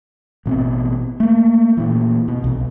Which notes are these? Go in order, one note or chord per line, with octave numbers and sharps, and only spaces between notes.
A1 B2 B3 C4
A3 A#3
A#2 E3
B2
B1 C3